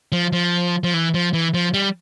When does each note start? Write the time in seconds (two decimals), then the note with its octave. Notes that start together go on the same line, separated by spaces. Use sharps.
0.12 F3
0.32 F3
0.84 F3
0.94 E3
1.14 F3
1.33 E3
1.54 F3
1.74 G3